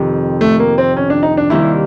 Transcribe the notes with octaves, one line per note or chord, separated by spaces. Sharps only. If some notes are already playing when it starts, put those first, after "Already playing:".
Already playing: F2 C3 D#3
A3
A#3
C4
C#4
D4
D#4
D4
D#2 D#3 G3 C4 E4